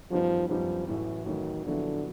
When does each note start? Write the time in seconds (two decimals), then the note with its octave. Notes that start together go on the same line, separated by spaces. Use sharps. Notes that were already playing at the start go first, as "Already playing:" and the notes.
0.11 F#2 D#3 F3 G3 B3 D#4
0.49 F#2 D#3 F3 G3 B3 D#4
0.88 A1 A2 E3 F#3
1.26 A1 A2 D#3 F#3
1.65 A#1 A#2 D3 F#3 B3 E4